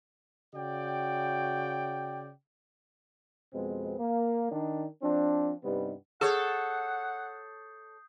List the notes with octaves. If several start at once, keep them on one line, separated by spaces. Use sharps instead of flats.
C#3 F#4 D5 G5
F2 B2 G#3 B3 C4
A#3
D#3 D4 D#4
F3 C4 D4
G2 C3 G3 B3 D#4
G#4 A4 C#5 F#5 D#6 G6 C7